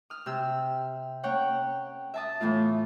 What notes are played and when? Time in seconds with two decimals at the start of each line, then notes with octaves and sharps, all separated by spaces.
0.10 D#6 F6
0.26 C3 G4 E6
1.23 A#3 C#4 C#5 F#5 G5
2.14 E5 A5 D#6
2.40 A2 E3 A3 B3 F4